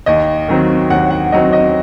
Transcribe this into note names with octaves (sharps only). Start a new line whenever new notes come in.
D#2 D#5
D#3 F#3 C4
D#2 F#5
F#5
D#3 F#3 C4 D#5
D#5